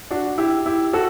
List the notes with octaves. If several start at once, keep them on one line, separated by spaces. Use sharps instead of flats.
D4 F#4
E4 G4
E4 G4
F#4 A4